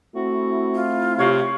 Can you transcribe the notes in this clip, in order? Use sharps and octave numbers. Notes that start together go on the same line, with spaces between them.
A3 C4 E4 F#4
F4
C3 C#5 F5